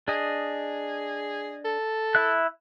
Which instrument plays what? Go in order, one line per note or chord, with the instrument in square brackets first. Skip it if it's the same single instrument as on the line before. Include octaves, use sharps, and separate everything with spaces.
[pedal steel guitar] D4 D#5 [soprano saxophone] G#4
[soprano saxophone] A4
[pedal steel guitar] E4 E5 F#6